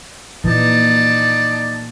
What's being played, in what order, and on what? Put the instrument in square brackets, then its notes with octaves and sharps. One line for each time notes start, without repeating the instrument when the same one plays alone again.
[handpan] A#2 E3 [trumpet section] D#4 D5 A5